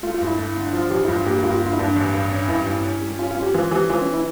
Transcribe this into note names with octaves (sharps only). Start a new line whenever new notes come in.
A3 F4
F4
G2
E4
A3
D3
F3 F4
A1 G4
E4
G2 F4
A#3 G4
G4
G2 F4
G4
F4
D3
F4
E4
G2 D4
A1
G2
C#4
G2 E4
G2
C#4
G3
C#4 F4
F4
C#4
G4
E3 F4
E3 G4
E3 F4
C#4
E4